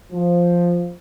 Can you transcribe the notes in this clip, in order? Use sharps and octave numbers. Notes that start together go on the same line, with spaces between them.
F3